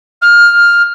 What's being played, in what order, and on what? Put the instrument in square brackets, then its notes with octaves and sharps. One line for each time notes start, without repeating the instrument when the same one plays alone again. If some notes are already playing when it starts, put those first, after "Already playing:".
[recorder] F6